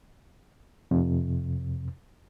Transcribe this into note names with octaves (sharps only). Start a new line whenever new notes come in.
F2 C3